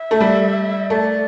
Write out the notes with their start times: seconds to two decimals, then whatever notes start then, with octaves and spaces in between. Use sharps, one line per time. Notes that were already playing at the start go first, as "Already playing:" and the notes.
Already playing: E5
0.11 A3
0.20 G3
0.90 A3 D5